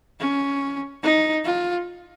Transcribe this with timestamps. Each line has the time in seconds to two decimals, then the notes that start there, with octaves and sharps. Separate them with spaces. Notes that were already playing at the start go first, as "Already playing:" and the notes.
0.20 C#4
1.03 D#4
1.45 F4